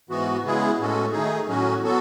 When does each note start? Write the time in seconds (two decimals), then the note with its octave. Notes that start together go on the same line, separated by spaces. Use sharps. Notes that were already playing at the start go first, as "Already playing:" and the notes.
0.09 G#2 E3 B3 F#4
0.44 C#3 G#3 B3 E4 G#4
0.78 A2 G#3 C#4 F#4 A4
1.12 D#3 A3 D#4 G#4
1.47 A2 F#3 C#4 F#4
1.82 F#3 B3 F#4 A4